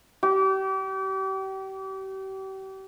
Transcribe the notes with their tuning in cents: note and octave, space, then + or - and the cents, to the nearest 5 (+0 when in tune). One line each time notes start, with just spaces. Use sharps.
G4 -35